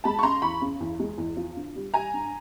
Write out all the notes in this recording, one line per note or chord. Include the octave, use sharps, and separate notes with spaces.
G#3 A5 B5
C#6
C#3 A#5 C6
E2 B5 C#6
C#3
E2
G#3
E2
F3
D3
G3
G3 G#5 A#5
G2